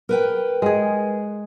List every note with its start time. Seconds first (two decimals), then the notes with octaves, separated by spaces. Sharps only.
0.09 A#4 B4 G5
0.62 G#3 G#4